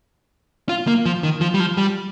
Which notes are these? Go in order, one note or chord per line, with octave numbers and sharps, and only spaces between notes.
F4
A#3
F3
D#3
F3
G3
F3
G3